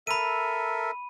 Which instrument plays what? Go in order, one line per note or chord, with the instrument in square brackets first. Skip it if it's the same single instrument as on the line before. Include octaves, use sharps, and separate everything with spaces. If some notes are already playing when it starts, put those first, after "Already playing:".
[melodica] A4 A#4 E5 [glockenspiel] B5 D#7